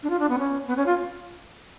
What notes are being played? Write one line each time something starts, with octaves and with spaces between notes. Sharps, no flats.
D4
F4
D4
B3
C#4
B3
C#4
F4